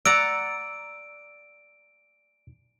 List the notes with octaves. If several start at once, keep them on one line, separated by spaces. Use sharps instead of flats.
D5 F#5 A#5 E6 D7